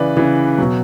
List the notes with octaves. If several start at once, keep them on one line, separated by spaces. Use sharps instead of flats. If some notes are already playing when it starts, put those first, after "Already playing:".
Already playing: C#3 E3 B4 D5
C#3 E3
B2 F#3